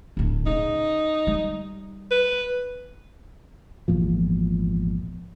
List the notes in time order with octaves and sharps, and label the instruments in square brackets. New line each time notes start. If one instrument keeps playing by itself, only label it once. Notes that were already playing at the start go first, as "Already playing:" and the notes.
[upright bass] D1 D4
[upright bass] C#3 [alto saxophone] D#4
[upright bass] G3
[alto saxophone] B4
[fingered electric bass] G#1 E2 A#2 F3